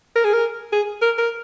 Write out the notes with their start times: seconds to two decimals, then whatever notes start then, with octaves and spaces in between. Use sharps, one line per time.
0.16 A#4
0.24 G#4
0.33 A#4
0.72 G#4
1.01 A#4
1.18 A#4